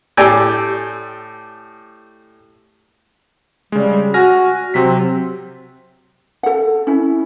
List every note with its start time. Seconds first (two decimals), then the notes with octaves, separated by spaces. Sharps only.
0.17 A2 G4 D5 G5 G#5 E6
3.72 C#3 G3 G#3
4.14 F#4 G#5 F6 A#6
4.74 C3 F#3 C4 B6
6.43 A4 F#5
6.87 C#4 E4